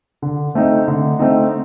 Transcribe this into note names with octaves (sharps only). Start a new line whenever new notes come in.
D3
A3 C4 D#4
D3
A3 C4 D#4